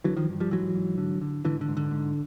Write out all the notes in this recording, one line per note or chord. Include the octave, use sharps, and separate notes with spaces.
D3 E3 F#3
D#3 F3
G2
F3 G3
G#2 E3 F#3
G#2
D3
D3
G#2 D3 E3
D3
G#2
D3
G#2